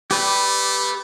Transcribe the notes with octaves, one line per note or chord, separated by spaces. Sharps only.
A3 G4 B4 D5